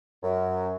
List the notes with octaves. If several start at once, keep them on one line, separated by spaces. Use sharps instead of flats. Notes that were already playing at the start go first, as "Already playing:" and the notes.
F#2